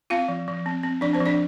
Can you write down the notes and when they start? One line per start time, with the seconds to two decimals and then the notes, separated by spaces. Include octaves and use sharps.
0.10 C4 F4 F5
0.28 F3
0.48 F3
0.66 C4
0.83 C4
1.01 F3 D4 D5
1.13 C4 C5
1.20 F3
1.26 D4 D5